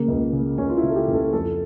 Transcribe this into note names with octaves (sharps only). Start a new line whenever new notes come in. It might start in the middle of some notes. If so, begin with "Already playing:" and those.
Already playing: C#3 A#3
C#2
C#3
C#2 C#4
F4
E4
C#3
A4
G4
C#2
A4
F2 A4